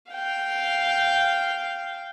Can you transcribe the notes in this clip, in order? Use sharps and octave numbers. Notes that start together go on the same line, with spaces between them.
F5 G5